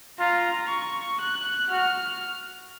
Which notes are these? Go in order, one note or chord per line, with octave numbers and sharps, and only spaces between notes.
F4 A#5
C#6
F#6
F#4 F6